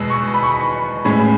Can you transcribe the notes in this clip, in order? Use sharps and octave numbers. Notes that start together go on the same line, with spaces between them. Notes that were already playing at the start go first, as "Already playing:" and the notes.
Already playing: E2 B2 G#3 B3 E6
C#6
B5
C#6
B5
A2 G#3 C#4 B5